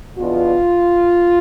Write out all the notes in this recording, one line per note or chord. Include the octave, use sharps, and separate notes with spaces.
E2 B2 B3 D4 F4